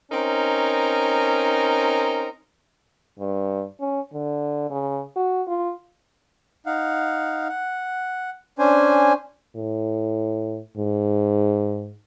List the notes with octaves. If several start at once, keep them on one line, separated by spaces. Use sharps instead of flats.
C4 C#4 D#4 A#4
G2
C#4
D3
C#3
F#4
F4
D#4 F5 F#5
F#5
C#4 D4 C5 G#5
A2
G#2